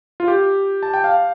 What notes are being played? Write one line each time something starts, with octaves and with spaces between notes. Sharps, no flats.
F4
G4
A5
G5
F5